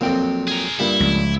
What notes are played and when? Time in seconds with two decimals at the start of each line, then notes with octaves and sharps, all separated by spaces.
0.01 F2 A#2 F#3 C4 G5
0.48 G#4 A#4
0.79 G2 A#2 G3 E4
1.00 C#2 F3